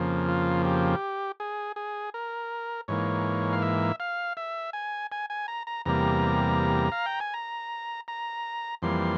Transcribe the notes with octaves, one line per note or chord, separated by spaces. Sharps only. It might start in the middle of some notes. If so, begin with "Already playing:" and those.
Already playing: F2 C#3 F3 A#3
F4
G4
G#4
G#4
A#4
G#2 E3 A#3 C#5
F5
E5
F5
E5
G#5
G#5
G#5
A#5
A#5
E2 C3 G3 A#3 A#5
F5
G5
G#5
A#5
A#5
F2 E3 G3 A#3 C6